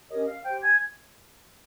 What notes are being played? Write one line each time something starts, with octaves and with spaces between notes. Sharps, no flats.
C#4 G4 A#4 C#5 D#5 D#6
F5 F6
G4 C5 G5 G6
G#5 G#6